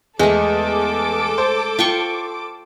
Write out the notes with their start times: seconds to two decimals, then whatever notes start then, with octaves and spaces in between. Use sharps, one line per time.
0.19 E2 G#3 A3 A4 D6
1.38 C5
1.79 F4 G5 C#6